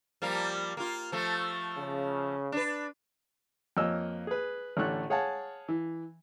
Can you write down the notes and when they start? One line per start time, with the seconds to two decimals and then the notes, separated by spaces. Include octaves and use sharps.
0.22 F3 G3 A#3
0.77 A#3 F4
1.12 F3 A3
1.78 C#3
2.52 D4 B4
3.77 F2 A#3 C#5 D#5 E6
4.27 G#4 B4
4.77 A1 D3 A3 C#5 F#6
5.10 G#4 C#5 F5 F#5 G#5 A5
5.68 E3